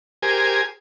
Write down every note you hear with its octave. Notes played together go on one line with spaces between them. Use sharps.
G4 G#4 A#4 C5 G#5